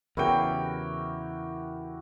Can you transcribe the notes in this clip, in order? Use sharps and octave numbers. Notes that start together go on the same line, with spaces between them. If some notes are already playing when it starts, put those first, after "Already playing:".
E2 C#3 E4 F#4 G4 A#4 G5